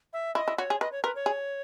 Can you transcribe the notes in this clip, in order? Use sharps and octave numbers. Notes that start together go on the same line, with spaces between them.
E5
E4 D#5
E4
F#4 C#5
G#4
B4 D#5
C#5
A#4 B4
C#5
G#4